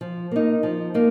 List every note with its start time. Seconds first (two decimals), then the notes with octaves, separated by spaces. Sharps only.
0.01 F3
0.31 A#3 D#4
0.63 F3
0.94 A#3 D#4